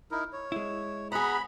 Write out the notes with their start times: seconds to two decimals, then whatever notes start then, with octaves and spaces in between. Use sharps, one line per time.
0.11 D#4 E4 A#4
0.33 C#5
0.52 G#3 E4
1.12 B3 G#4 F#5 A#5 B5